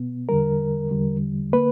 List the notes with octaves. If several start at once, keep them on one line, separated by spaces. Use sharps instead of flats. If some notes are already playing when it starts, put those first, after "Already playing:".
Already playing: B2 B3
E2 D3 G3 A#4
E2 D3 G3
D3 A#3 B4